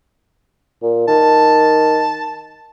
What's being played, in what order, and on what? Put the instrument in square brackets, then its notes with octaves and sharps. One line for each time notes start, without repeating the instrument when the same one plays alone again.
[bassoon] A#2
[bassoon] D#3 [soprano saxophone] A5